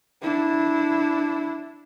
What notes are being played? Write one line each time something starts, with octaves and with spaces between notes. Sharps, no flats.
D4 E4